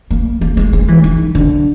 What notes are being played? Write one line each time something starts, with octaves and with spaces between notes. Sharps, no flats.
A#3
A#3
G#3
G#3
E3
D#3
D3